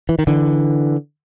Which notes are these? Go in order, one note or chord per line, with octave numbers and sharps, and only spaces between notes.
E3
D#3
D3 E3